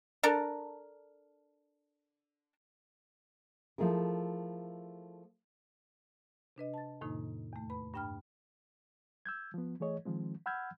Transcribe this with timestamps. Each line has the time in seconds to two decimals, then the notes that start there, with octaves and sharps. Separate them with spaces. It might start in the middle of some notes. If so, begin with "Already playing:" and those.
0.23 D4 A4 A#4
3.78 F3 A3 E4 G#4 A#4
6.56 C3 D4 B4 D#5
6.74 A5 A6
7.01 F2 A2 C3 D#3 A#3 D#4
7.53 E2 A3
7.70 B4 B5
7.94 G2 D4 G5 B5 F6
9.26 E6 G6 G#6
9.54 F3 B3
9.80 E3 A3 G#4 C#5 D#5
10.05 D#3 F3 G#3 C4
10.46 F#5 B5 E6 F6 G6 G#6